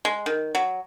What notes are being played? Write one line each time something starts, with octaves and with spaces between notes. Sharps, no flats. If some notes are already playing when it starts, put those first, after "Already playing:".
G#3
D#3
F#3